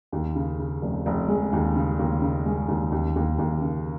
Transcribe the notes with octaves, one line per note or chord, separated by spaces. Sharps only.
D#2
C#3
C#3
F1
F1
G#3
D#2
C#3
D#2
C#3
G#3
D#2
D#2
D#2
D#2
C#3